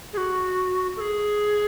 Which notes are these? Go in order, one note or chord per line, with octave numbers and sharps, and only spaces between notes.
G#4
F#4
A4
G#4